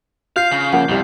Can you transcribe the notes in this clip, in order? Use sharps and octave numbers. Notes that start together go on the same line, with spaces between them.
F4 F5 G6 C7
C#3
F3 A#3 C#4 F#5
C2 F2 G3